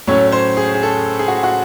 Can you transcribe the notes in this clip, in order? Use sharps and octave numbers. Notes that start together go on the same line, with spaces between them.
A2 F#3 A3 C#4 C#5
C#5
C5
G#4
G#4
A4
G#4
F#4
F#4